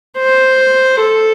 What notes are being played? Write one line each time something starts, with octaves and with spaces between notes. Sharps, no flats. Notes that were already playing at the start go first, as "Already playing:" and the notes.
C5
A4